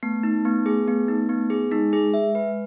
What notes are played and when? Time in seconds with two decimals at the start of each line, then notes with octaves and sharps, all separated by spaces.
0.03 A3 B3
0.23 D#4
0.45 B3
0.66 G#4
0.88 B3
1.08 D#4
1.29 B3
1.50 G#4
1.71 G#3 D#4
1.93 G#4
2.14 E5
2.35 B4